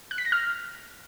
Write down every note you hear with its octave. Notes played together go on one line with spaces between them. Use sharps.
F#6
B6
A#6
F6